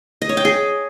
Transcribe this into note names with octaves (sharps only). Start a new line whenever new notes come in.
D#5
C#5
G5
G#4